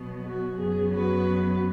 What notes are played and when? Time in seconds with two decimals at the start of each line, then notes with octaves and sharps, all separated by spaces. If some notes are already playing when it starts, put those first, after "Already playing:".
Already playing: B2 F#3 B3
0.25 F#4
0.59 F#2 F#3 B3 G#4
0.94 F#4 B4